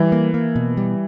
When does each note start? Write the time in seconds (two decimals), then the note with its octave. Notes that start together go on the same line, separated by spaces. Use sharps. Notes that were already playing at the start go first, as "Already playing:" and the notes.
Already playing: E3 G3
0.12 A#3
0.34 A#3
0.56 B2
0.77 G3